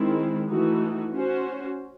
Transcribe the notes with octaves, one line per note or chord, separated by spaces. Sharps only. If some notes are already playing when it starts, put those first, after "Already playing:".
Already playing: D#3 G#3 C4 E4
E3 A3 D#4 F#4
C#4 F#4 C5